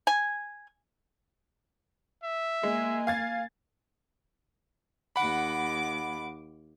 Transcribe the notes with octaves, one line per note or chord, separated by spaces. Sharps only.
G#5
E5
G#3 A#3 G#5
F5 G#6 A6
D#2 F#5 B5 D6